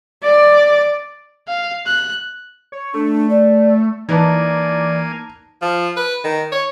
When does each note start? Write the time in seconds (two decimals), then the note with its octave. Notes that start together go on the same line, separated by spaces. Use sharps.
0.23 D5
1.48 F5
1.86 F#6
2.72 C#5
2.94 A3 D4
3.30 D5
4.09 E3 A#3 D#4 B4 D5 G#5 A5
5.62 F3
5.96 B4
6.24 D#3
6.52 C#5